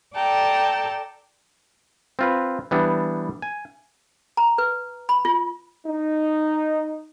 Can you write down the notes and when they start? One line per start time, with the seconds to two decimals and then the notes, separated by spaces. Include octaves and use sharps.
0.16 A4 D5 G5 A5 A#5
2.19 C4 F4 B4
2.71 E3 G3 B3 D4
3.42 G#5
4.37 A#5
4.58 B4
5.09 B5
5.25 F4
5.87 D#4